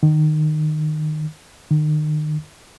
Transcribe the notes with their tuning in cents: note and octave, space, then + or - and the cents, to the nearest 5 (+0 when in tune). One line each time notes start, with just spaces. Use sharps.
D#3 -20
D#3 -35